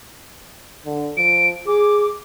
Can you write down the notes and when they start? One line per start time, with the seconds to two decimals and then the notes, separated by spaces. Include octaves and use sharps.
0.86 D3
1.17 F3 D7
1.67 G#4 D6